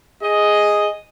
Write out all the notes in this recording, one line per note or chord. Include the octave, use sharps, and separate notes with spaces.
G#4 D#5